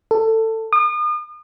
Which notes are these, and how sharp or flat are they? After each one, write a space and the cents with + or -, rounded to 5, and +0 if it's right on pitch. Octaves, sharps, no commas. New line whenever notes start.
A4 +20
D#6 -40